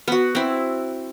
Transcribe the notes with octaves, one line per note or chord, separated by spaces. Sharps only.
B3 F#4
C4 E4